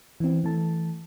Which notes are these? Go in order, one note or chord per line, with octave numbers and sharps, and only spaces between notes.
E3 C4
E3 A3 A5